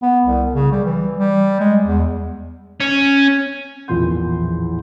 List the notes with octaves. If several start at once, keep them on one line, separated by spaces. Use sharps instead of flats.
B3
C2
C#3
G3
E3
G3
G#3
E2
C#4
A1 E2 A#2 F3 C6 G6